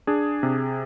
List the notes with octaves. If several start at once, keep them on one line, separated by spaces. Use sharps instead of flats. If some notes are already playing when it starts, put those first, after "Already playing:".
D4 G#4
C3